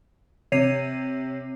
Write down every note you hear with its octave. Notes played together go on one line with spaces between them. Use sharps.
C3 C#5 C7 D#7